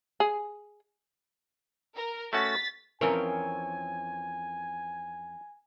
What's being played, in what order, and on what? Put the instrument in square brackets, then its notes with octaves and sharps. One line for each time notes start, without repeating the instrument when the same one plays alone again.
[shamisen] G#4
[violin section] A#4
[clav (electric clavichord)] A3 C#4 F#4 [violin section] A6 B6
[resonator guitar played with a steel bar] F2 C4 C#5 [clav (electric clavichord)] E3 C#4 [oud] A#4 [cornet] G#5